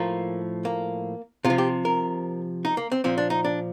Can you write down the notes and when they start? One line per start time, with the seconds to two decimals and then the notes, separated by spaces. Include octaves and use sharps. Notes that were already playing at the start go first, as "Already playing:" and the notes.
Already playing: A2 F3 A#3
0.65 A#3
1.45 C3 F4
1.50 F3
1.58 G4
1.85 A#4
2.65 D#4
2.77 A#3
2.92 C4
3.04 A#2 F3 C4
3.18 D4
3.30 D#4
3.45 D4